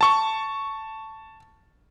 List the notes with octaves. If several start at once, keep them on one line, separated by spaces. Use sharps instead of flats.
A5 C#6